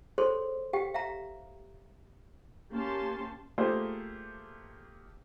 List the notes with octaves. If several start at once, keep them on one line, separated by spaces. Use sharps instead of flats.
G#4 A4 C5 C#5 C6
G4 F5 G5
E5 F5 A#5
A#3 C#4 G4 A5 C6
A3 A#3 F4 G4 G#4 C5